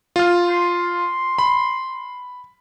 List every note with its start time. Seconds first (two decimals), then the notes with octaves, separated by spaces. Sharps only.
0.16 F4 F6
0.49 C6
1.38 B5